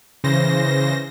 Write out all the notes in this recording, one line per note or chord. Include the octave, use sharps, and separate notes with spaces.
C#3 E3 C5 A#6